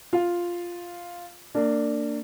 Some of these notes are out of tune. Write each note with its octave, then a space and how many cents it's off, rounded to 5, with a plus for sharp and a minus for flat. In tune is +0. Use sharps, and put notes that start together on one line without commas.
F4 +0 F5 +0
A#3 -30 D4 +0